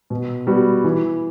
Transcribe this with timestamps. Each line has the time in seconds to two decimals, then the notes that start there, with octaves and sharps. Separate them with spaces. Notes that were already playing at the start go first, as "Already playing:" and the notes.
0.10 B2
0.47 G3 B3 F#4
0.84 E3